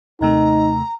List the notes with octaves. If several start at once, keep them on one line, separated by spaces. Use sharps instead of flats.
D#2 C3 A3 D#4 A#5